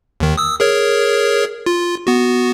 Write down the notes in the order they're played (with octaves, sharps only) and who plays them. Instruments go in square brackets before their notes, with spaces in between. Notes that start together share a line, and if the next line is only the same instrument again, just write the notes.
[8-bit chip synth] D#2 D#3
D#6 E6
G#4 A#4 C#5
F4
B3 F#4